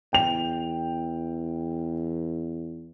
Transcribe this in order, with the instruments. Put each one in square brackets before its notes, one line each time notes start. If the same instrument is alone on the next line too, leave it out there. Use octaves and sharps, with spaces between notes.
[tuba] E2 [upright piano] G5 F7